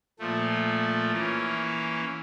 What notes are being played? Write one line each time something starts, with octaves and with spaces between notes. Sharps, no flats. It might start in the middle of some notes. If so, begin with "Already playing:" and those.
A#2 F3 A3
E3 A#3 C#4